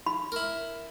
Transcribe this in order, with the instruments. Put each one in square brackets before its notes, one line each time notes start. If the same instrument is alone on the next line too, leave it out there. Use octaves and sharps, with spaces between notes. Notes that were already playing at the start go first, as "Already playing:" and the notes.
[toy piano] B5
[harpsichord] E4 A#4